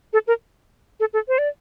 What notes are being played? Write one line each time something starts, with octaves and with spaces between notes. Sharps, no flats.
A4
A#4
A4
A4
C5
D5